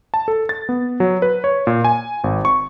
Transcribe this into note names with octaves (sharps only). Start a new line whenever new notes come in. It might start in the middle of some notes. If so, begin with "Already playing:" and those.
A5
A4
A6
B3
F#3
B4
C#5
A#2
G#5
G#1
C#6